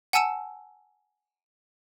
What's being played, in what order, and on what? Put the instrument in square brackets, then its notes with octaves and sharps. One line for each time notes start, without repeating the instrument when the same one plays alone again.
[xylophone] F#5 G#5 A5 E6 C#7 E7